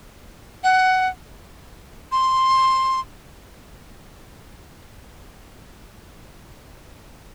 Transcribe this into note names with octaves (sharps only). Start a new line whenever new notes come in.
F#5
C6